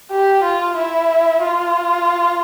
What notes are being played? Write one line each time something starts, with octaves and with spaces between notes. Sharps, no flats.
G4
F4
E4
F4